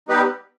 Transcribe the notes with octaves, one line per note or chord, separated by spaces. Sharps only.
G3 B3 D#4 G4 B4